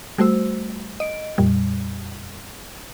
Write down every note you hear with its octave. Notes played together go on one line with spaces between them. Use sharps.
G3 A3 F#4 C5 E6
D#5 D7
F2 A#2 G3